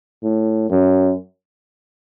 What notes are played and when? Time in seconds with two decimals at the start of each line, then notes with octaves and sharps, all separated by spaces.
0.23 A2
0.70 F#2